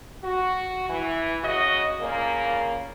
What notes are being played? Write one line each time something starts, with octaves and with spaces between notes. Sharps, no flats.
F#4
E3
C#3 F#4 D#5
A#2 C#3 A#3